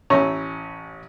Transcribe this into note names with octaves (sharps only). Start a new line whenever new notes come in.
A1 C#4 E4 C#5 A#5